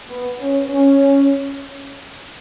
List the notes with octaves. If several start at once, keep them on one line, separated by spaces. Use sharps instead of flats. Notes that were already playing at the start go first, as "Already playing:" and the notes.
B3
C#4
C#4